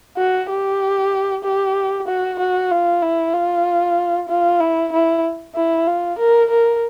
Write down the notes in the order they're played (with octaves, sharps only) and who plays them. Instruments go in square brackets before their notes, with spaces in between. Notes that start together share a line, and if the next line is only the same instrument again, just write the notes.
[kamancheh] F#4
G4
G4
F#4
F#4
F4
E4
F4
F4
E4
E4
E4
F4
A#4
A#4